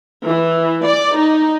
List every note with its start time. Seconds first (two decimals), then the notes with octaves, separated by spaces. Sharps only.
0.25 E3
0.85 D5
1.16 D#4